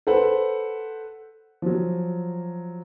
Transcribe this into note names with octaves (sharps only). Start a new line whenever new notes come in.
A4 B4 C5 F#5
F3 F#3